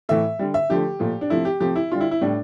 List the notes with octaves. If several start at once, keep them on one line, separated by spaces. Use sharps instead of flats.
A2 E3 A3 E5
D3 G3
E5
D3 F3 A3 G4
A#2 F3 A3
D4
C3 F3 A3 E4
G4
C3 F3 A3 G4
E4
D3 G3 F4
E4
E4
A2 G3 D4